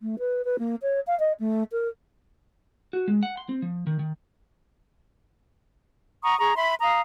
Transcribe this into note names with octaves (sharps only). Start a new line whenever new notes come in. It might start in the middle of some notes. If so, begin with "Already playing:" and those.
A3
B4
B4
A#3
C#5
F5
D#5
A3
A#4
F#4
G#3
F#5
C6
C4
F3
D#3
D#3
F#5 A#5 C#6 D#6
G#4 A#5 C#6
E5 B5 C6
F5 A#5 D#6